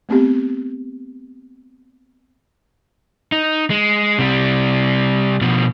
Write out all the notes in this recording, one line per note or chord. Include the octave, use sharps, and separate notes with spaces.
A3 B3 C4 G4
D#4
G#3
C3 G3
B2 F3